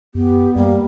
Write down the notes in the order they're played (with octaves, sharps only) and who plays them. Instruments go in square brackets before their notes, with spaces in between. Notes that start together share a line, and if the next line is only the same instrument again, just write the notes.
[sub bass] F#2 [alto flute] B3 [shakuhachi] G4
[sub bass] F#2 [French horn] G3 [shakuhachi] A#3